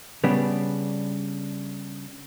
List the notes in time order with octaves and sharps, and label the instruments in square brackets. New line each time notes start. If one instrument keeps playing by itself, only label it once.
[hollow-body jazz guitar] C#3 G3 B3 D4